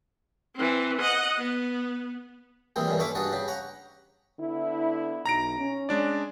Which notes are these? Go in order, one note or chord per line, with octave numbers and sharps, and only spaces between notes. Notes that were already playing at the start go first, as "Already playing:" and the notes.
E3 C4
D#5 F#5
B3
A#2 E3 G3 C4 G#4
C#2 G2 A#2 D3 E3
D3 C#4 C#5 E5 B5 D6
G2 D4 F#4 G#4 F#5 D#6
C#3 G4
C#5 F#5 A#5
D3 B3 E4
B1 A#5 A#6 D7
C#4
G#3 D4 D5